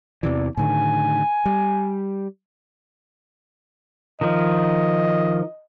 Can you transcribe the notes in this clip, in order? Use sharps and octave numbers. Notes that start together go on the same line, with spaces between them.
E2 C3 E3 D5
A2 D3 D#3 G#5
G3
D#3 F3 D#5